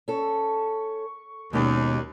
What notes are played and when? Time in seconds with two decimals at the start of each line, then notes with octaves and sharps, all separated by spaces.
0.08 C#4 A4 C#6
1.53 D#2 B2 G#3 C#4 D#5